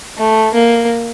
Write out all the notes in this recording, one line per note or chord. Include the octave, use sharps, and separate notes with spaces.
A3
A#3